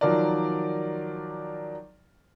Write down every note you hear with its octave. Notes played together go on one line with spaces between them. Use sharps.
D#3 F3 F#3 A#4 D5